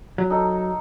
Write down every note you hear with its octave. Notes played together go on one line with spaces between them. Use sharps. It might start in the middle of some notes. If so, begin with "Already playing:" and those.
F#3
D#4 A4